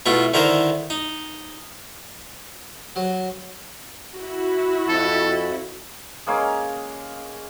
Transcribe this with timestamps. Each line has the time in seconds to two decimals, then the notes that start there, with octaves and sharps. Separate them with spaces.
0.06 B2 A3 E4 F4
0.34 D3 D#3 E4 A#4 C5
0.90 D#4
2.96 F#3
4.14 E4 F#4
4.89 F2 A4
6.27 G#3 A#3 C#4 F5